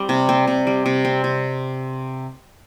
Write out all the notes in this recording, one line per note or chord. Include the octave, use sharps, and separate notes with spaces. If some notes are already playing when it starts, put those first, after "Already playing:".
Already playing: G3 C4
C3
C4
C3
G3
C3
C4
C3